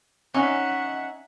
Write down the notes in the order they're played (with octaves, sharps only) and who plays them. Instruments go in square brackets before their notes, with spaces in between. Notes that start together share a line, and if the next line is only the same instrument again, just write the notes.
[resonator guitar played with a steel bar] C#4 [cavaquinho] D#4 D#5 C#6 [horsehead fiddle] E5 F#5